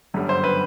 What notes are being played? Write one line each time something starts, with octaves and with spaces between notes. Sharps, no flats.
G1 F#2 D3 G3
C5
B4